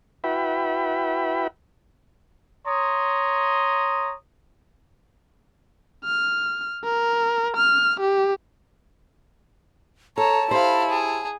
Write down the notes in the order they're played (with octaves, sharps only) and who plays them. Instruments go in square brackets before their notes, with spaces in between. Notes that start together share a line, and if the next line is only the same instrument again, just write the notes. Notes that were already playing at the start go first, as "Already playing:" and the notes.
[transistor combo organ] E4 F#4 B4 E5 G5 B5
[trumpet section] C#5 A#5 C6 D#6
[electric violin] F6
A#4
F6
G4
[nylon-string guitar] A4 [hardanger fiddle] C#5 [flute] A5 [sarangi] A#5
[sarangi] E4 [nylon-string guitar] G4 C5 [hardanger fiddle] F5 B5
[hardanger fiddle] G#4